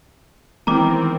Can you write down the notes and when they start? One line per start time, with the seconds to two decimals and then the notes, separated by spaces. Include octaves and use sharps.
0.67 D#3 E3 G#3 B3 C4 E4 A#5 D6